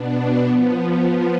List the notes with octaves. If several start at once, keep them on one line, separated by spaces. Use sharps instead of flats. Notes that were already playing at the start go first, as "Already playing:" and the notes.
Already playing: B2 B3 D4
F3 B3